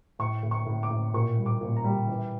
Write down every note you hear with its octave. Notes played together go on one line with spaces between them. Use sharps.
A2 C#6
A2
C#6
A2
D6
A2
A#2 C#6
G3
D6
A#2
A#5
G3
E3